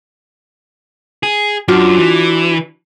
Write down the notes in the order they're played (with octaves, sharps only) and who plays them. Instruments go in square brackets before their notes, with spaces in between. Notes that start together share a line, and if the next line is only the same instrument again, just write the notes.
[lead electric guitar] G#4
[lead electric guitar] F#2 [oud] D4 F4 F#4
[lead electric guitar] E3